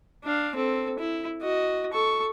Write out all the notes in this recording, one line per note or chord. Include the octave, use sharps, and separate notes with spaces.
D4 F5
C4 A4
E4
F#4 D#5
A4 C#6